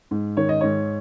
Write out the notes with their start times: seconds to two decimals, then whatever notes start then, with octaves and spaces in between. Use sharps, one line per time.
0.11 G#2
0.37 D#3 C#5
0.49 D#5
0.61 G#2 C#5